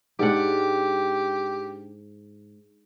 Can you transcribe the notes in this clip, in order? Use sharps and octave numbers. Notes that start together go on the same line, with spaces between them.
G#2 D4 G4 F#5